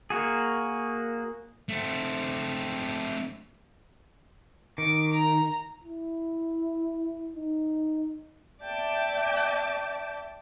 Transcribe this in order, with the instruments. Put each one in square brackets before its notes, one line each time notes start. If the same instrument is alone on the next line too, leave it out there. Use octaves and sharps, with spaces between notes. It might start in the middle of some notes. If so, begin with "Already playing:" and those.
[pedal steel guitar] A#3 F#4 G#4
[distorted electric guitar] A3 C4
[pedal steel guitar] D#3 [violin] D6
[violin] A#5
[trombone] E4
D#4
[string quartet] D5 E5 G5 A5 D6